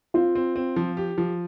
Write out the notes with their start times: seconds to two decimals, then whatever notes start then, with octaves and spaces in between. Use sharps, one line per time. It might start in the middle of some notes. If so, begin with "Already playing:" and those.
0.14 C4 F4
0.35 C4
0.56 C4
0.76 F3
0.97 G4
1.18 F3